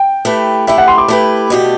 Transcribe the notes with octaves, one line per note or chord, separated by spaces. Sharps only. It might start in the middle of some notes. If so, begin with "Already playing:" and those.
Already playing: G5
A3 E4 G4 B4
A3 E4 G4 B4 E5
F#5
C6
D6
A3 E4 G4 B4
B2 A3 D4 G4